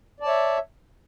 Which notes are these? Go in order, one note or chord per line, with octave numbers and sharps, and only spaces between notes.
C#5 D5 E5 A5